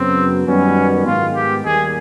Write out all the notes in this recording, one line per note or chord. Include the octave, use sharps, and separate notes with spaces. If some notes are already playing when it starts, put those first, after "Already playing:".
Already playing: F#2 C#3 F#3 B3 C4
F#2 D#3 G3 B3 C#4
G#2 D#3 G#3 B3 F4
G4
D#2 D#3 G3 A#3 G#4